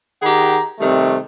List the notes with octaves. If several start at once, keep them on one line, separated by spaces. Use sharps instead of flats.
D#3 G4 G#4 F#5 A#5
C3 D#3 G3 A3 C4